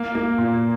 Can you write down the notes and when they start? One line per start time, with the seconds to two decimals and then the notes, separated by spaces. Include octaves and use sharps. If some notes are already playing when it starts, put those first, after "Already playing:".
Already playing: A#3
0.15 A#3
0.38 A#2